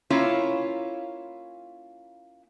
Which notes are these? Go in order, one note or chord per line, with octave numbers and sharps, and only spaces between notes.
A#3 C#4 E4 F4 C#5 F5